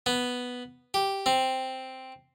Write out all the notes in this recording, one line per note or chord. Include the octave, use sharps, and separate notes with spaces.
B3
G4
C4